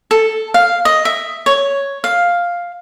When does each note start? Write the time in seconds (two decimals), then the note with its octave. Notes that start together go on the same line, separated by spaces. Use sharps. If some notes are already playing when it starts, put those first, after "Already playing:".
0.11 A4
0.54 F5
0.85 D#5
1.05 E5
1.46 C#5
2.04 F5